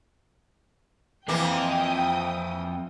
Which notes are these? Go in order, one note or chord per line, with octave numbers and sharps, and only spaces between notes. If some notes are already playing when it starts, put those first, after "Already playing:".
F2 E3 A#3 G5 D#6